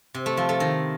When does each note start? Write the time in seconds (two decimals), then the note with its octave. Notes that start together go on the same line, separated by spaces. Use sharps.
0.14 C3
0.26 A3
0.37 F3
0.49 A3
0.60 D#3